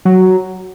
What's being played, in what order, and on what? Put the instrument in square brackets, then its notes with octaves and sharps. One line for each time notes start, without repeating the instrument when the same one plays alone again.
[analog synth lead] F#3